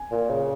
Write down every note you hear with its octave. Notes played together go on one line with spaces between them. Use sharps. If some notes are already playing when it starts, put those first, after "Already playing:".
Already playing: G#5
A#2
C#3